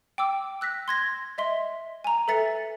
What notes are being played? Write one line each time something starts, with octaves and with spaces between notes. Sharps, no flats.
G5 D6 E6
E6 F#6 A#6 B6
C6 G#6 A#6
D#5 E5 C6
G#5 A#5
A4 B4 E5 A6 C#7